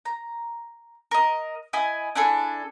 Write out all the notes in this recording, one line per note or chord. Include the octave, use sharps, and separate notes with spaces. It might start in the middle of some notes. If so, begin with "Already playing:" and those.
A#5
A#4 D#5
E4 D#5 G#5
D4 E4 G#4 A4